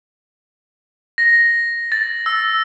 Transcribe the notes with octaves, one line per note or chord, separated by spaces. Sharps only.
A#6
A6
E6